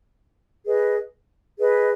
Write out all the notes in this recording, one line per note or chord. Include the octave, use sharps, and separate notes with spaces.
G#4 B4 D#5
G#4 B4 D#5